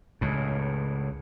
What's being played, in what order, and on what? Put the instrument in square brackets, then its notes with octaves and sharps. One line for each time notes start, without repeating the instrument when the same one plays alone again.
[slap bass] C#2 A2